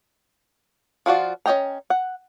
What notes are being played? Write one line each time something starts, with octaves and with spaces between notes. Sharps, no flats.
F3 F4 F#4 D5
C#4 A4 D#5 G5 A#5
F#5